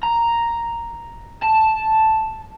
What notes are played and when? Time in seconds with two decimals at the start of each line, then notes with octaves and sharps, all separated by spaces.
0.03 A#5
1.43 A5